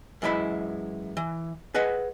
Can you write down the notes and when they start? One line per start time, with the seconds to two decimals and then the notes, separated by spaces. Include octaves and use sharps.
0.22 F#2 E3 G#3 E4 B5
1.17 E3
1.74 G#4 B4 D#5 F#5